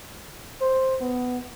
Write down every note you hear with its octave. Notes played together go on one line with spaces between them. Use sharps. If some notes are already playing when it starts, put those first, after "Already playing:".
C5
B3